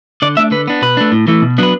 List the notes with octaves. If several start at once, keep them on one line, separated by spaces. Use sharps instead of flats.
D3 D5
A3 D4 E5
D3 B4
B3 D4
B2 B4
A3 D4
A2
E3 A3
B2
F#3 B3 D4 B4